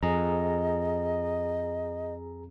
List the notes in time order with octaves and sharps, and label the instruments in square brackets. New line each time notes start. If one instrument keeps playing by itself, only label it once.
[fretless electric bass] F2 [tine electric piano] G#4 A#5 [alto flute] D#5